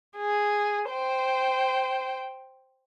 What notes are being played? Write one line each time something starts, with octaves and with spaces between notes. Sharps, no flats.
G#4
C5 G5